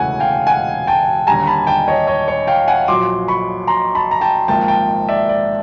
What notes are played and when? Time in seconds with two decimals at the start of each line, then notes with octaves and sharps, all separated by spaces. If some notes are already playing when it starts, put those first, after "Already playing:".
Already playing: E1 D2 C#3 E3 A3 F#5 G#5
0.20 F5 G5
0.47 F#5 G#5
0.87 G5 A5
1.27 D#2 D3 G3 G#5 A#5
1.47 A5 B5
1.67 G5 A5
1.88 C#5 D#5
2.07 C#5 D#5
2.28 C#5
2.47 F5 G5
2.68 F#5 G#5
2.88 A#1 A#2 F#3 C6 D6
3.28 B5 C#6
3.67 A#5 C6
3.95 A5 B5
4.11 A#5
4.21 G5 A5
4.48 G#1 G#2 F3 A#3 G5 A5
4.68 G5 A5
5.09 D5 E5
5.29 D5